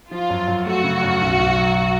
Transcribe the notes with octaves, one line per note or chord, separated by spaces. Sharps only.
F3 F4
F#2
F#2
A3 F#4
C#3
F#2
B1
B1
F#3